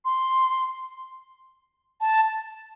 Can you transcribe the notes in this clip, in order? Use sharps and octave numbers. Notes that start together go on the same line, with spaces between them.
C6
A5